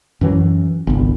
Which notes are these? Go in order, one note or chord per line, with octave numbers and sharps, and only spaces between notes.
F#2 E3 F#3
G1 C2